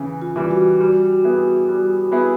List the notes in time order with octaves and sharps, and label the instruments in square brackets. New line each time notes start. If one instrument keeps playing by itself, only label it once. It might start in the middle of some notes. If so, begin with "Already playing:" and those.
Already playing: [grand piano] C#3 E3
[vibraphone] F4
[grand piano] E3 G3
[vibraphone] F#4
[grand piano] G3
B3 E4 G#4
G3
B3 E4 G#4